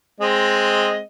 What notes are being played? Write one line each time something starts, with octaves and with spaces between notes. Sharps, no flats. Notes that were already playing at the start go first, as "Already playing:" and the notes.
G#3 C4 D#5